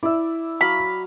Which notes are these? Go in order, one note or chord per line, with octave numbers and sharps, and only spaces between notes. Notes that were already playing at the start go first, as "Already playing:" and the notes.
E4 D5 E5
F#3 F5 B5